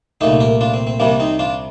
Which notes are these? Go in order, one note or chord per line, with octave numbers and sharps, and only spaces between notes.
C2 A#2 A3 D#4 G4
G4 A#4
D4 F4
C4
C4
C2 C3 G3 A#3 D4
C4 D#4
D4 F4